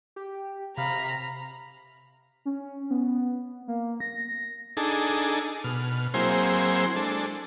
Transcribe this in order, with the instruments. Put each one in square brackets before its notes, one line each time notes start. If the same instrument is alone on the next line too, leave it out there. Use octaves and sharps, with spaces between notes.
[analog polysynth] G4
[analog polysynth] C3 F5 [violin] A#5 B5
[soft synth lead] C#4
B3
A#3
A#6
[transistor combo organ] D4 D#4 G#4 A4
B2 F6
F#3 A#3 C4 E4 G#4 C5
G#3 D4 A4